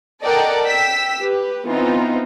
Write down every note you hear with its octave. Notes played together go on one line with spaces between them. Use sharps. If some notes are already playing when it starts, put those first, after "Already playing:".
A4 A#4 D5 D#5 F#5 G5
G5 E6 B6
G4 B4
E3 B3 C4 D#4 F4